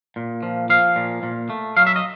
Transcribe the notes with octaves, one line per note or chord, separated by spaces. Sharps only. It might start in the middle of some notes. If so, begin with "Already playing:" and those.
A#2
F3
F3 F5
A#2
A#2
A3
F#3 F5
E5
D#5